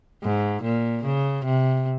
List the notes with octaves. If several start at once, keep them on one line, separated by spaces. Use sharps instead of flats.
G#2
A#2
C#3
C3